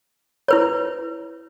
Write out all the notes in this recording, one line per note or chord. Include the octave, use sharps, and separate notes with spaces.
E4 B4 C#5